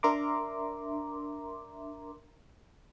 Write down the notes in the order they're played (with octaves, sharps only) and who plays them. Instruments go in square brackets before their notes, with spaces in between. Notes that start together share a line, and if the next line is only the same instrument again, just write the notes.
[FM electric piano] D4 A#4 E5 A#5 C6 D6